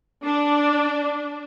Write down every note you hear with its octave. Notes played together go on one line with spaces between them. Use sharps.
D4